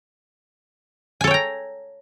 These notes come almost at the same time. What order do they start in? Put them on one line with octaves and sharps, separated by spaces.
G#5 A4 C#5 G5 A#5